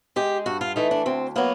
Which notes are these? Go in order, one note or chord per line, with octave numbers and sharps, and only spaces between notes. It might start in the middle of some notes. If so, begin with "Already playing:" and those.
G#3 G4
G2 F#4
F4
E3 A3 D#4
D4
D2 C4
F#3 A#3 B3